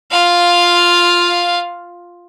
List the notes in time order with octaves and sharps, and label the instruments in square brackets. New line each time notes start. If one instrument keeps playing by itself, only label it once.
[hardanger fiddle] F4 F5